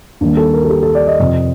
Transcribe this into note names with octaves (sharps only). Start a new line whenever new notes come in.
D#2 D#3 G3 D4
A4
A#4
A4
G4
A4
D5
D#5
F2 C3 F3 C4